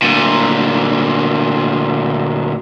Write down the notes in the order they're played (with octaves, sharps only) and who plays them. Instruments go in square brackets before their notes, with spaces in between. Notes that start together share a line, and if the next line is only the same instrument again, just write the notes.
[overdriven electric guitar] D2 A#2